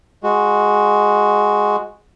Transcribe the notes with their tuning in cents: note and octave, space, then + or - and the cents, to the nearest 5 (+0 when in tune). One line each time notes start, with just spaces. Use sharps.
G#3 +0 F#4 -10